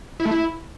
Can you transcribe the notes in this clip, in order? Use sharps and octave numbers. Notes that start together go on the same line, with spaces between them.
E4
A3
E4